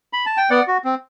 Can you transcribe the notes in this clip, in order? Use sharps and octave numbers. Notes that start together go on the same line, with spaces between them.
B5
A5
G5
B3 D5 F#5
F#4
C4